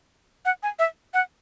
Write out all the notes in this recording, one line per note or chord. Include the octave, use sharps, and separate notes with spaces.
F#5
G#5
E5
F#5